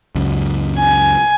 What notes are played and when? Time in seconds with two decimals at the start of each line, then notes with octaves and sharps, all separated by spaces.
0.15 C#2 F#2
0.79 G#5